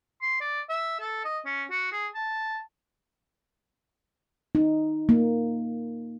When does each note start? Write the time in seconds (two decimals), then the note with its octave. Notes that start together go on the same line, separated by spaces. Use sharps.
0.22 C6
0.41 D5
0.69 E5
1.00 A4
1.25 D#5
1.46 C#4
1.70 F#4
1.92 G#4
2.14 A5
4.55 D#4
5.09 A#3